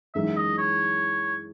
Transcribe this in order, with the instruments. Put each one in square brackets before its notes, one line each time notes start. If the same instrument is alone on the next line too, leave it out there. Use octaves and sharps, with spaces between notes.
[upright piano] F#2 E3 G#3 D#4 [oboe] E5
[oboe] D#5
C#5